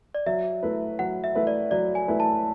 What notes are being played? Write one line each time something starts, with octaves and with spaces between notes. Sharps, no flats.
D5
F#3 E5
A3 E4 B4
F#3 F#5
E5
A3 E4 B4
D5
F#3 D5
G#5
A3 E4 B4
A5